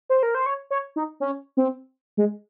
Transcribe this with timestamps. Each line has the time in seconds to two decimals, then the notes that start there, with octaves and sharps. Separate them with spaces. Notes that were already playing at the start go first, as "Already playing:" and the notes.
0.10 C5
0.23 A#4
0.35 C5
0.46 C#5
0.71 C#5
0.96 D#4
1.20 C#4
1.57 C4
2.17 G#3